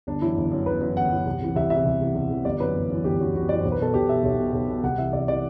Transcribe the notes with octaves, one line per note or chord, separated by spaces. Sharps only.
G1 D4
F#2 E3 E4
G1
F#2 E3
G1 B4
F#2 E3
G1 F#5
F#2 E3
C2
C3 E3
C2 E5
E3 E5
C3
C2
C3 E3
C2
C3 E3
G1 D5
F#2 E3 B4
G1
F#2 E3
G1 G4
F#2 E3 F#4
G1 F#4
F#2 E3 D5
C5
B1
B4
B2 A4
B1 G4
B2 E5
B1
B2
B1
B2
C2 F#5
C3 E3 E5
C2 D5
C3 E3 D5